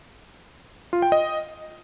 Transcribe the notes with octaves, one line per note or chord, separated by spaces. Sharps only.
F4
G5
D#5